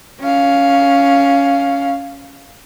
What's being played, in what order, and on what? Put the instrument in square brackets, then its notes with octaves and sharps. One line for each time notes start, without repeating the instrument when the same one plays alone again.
[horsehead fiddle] C#4 F5